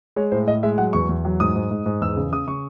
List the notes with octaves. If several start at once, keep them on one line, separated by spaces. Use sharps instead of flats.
G#3 C#5
A2 C5
A2 D#5
G#3 E5
F#3 F#5
E2 C#6
E2
F#3
G#2 D#6
G#2
G#2
G#2
E2 E6
C#3
C#3 D#6
C#3 C#6